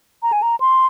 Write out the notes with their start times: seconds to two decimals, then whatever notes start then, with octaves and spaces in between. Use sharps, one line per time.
0.23 A#5
0.32 G#5
0.42 A#5
0.60 C6